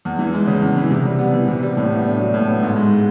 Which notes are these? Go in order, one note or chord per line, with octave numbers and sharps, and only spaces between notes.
E2
E3
G#3
C#3
E2
E3
C3
G3
B3
E3
C3
G3
A2
B3
D4
F#3
A2
B3
G#2
G#3